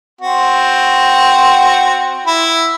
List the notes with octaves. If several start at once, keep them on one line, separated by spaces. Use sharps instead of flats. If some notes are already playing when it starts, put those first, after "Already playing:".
C4 F#4
E4